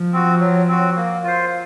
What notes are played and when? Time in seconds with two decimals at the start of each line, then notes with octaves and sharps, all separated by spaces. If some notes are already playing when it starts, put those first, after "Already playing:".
Already playing: F3
0.13 C4 F#4
0.41 F#3
0.68 C4 F#4
0.96 A#3
1.24 F4 C5